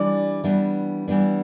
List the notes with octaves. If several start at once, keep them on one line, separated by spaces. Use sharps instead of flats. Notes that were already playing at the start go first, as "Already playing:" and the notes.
Already playing: E3 G3 D4 D5
E3 G3 B3 D4
E3 G3 B3 D4